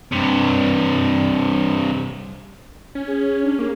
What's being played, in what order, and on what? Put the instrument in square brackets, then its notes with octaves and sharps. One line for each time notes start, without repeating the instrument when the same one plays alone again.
[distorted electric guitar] G2 C3
[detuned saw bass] C#4
[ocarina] G#4
D4
[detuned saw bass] A#3 [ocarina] G#4